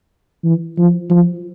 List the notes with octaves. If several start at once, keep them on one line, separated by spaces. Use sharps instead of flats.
E3
F3
F3